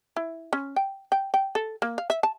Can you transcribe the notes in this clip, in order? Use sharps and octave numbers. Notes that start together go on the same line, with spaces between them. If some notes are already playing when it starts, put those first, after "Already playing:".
E4
C#4
G5
G5
G5
A4
A#3
F5
E5
A5